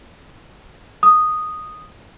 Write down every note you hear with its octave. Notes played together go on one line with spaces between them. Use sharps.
D#6